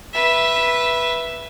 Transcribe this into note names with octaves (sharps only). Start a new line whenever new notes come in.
B4 E5